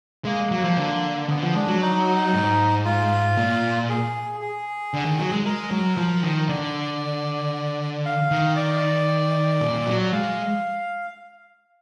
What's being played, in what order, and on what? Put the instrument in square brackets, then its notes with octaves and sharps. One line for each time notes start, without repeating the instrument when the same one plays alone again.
[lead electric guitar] G#3 [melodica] A#3
[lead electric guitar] F#3
F3
D3
[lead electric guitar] D3 [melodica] B3
[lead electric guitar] F3
[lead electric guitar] G#3 [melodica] D4
[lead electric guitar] F#3
[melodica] D#4
[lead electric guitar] G#2
[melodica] F4
[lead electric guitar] A#2
[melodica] G#4
G#4
[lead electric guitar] D3
D#3
F#3
G#3
[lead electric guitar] G#3 [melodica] A#4
[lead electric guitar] F#3
F3
D#3
[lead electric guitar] D3 [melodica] D5
[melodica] F5
[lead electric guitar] D#3
[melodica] D5
[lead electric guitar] A#2
F#3
[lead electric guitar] G#3 [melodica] F5